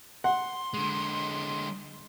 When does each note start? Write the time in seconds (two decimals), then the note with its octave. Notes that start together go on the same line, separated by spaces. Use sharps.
0.24 F#5 C6
0.74 D3 G#3